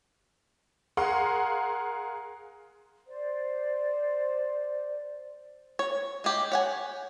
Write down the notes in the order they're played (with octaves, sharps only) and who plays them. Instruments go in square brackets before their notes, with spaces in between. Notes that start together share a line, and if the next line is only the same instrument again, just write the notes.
[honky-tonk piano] G#4 A#4 F5 F#5 C6
[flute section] C5 D5
[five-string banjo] C#5
G#3 G4
C#5 F#5 G#5